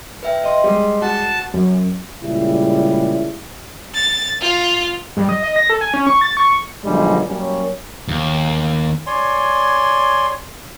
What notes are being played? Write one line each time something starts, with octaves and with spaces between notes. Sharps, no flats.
B4 E5 G5
D#5 G5 C6
G3 G#3
F#4 F#5 A5
F#2
A#2 C#3 G3 G#3 E4
A6
F4
G2
D#5
D#5
A#6
A4
G#5
C#4
C#6
A6
C#6
B1 G2 D3 F3 G3 G#3
F#2 G3 A#3 C#4
D#2
C#5 D5 G#5 C6